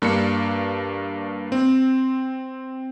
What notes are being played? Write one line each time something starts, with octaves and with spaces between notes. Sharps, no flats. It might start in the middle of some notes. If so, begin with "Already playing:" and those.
G2 A#3 D4 C#7
C4